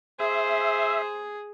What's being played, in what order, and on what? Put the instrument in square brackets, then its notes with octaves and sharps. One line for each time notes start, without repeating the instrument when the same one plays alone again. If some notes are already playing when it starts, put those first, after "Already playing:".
[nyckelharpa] G#4 [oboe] C5 [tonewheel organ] E5